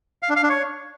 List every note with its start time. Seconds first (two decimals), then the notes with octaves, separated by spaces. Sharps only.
0.23 F5
0.29 D4
0.36 F5
0.43 D4
0.50 C#5